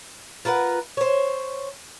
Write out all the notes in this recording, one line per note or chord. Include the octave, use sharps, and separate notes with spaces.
F4 A#4 B4 F#5
C5 C#5